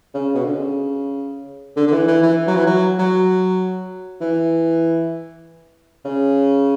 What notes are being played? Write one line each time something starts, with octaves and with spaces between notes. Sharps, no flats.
C#3
B2
D3
C#3
D3
D3
E3
E3
E3
F#3
E3
F#3
F#3
E3
C#3